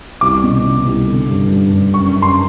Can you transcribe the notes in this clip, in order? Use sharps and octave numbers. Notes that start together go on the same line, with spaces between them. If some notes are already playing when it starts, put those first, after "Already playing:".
C2 D6
B2
B2
C2
D3
G2
G2
G2
F#2 C#6
F#2
C6